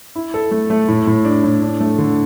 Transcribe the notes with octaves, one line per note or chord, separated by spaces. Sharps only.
E4
A4
A3
A3
A2
A2
D4
A2
D4
A3
D3